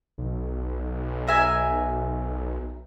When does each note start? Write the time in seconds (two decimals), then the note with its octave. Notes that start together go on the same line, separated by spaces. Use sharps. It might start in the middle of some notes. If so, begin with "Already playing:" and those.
0.18 B1
1.27 A#4 E5 G#5